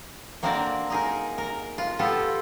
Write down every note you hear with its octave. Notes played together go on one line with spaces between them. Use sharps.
A#3 C4 D4 F#4 A#4 D5
D#4 G#4 A#4
A#4
F4
B3 C4 F4 G4 A4